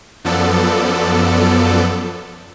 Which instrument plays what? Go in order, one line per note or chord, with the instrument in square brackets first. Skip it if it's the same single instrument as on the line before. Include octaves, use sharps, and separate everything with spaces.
[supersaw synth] F#2 F3 B3 A4 D5